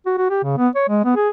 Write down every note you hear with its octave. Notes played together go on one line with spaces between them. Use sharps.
F#4
F#4
G4
C#3
B3
C#5
G#3
B3
G#4